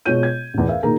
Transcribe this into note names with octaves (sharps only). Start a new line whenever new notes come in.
B2 G#3 F4 C#5 G6 D#7
G#6
A1 E2
A#4 E5 F5
A#2 D#3 G#4 A#4 A#5